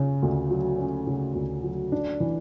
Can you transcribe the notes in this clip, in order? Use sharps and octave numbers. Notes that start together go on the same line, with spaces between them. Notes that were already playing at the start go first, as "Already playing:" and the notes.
Already playing: C#3 C#4
D2
F#3
C#4
C#3
D2
F#3
D4
E3